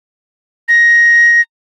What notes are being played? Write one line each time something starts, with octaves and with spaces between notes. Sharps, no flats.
A#6